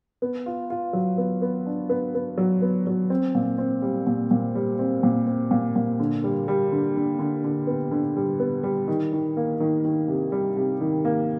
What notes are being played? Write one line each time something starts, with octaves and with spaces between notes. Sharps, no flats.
B3
F4
F4
F#3
B3
B3
D4
B3
B3
F#3
B3
F#3
C4
A#2
C4
G3
A#2
A#2
G3
C4
A#2
C4
A#2
A#2
D3
G3
G3
D3
D3
D3
D3
B3
D3
G3
B3
G3
D#3
D#3
A#3
D#3
D#3
C3
G3
C3
D#3
A#3